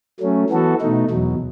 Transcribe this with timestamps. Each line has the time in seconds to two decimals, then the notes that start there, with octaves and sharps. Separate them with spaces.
0.20 F#3 A3 C#4
0.50 E3 B3 F#4 A4
0.81 B2 A3 D#4
1.10 E2 B2 F#3